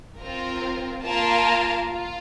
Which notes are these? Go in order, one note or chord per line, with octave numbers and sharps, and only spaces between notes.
C4 F4 A#4
A#3 F4 A#4 F5 A5
F4